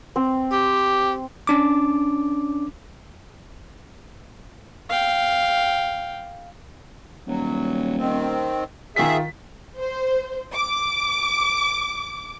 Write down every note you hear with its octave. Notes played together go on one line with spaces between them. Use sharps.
C4
G4
C#4 D4 D6
F5 G5
D#1 F#3
D#3 C4
D#3 F4 G#4 E5 B6
C5
D6